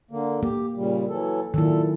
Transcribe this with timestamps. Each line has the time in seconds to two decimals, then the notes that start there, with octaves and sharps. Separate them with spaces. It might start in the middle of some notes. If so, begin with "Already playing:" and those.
0.11 D3 A#3
0.43 A#3 G4
0.76 A#2 C#3 G3
1.09 E3 F#3 A4
1.54 A#2 D#3 F#3 E4 A4